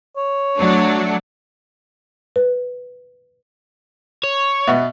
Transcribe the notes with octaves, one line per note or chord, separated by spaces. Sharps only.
C#5
F#3 A3 D4
B4
C#5
B2 B3 E5